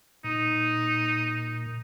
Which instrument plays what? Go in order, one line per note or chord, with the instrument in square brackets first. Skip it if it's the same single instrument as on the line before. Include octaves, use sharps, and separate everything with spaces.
[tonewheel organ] A#2 [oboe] D#4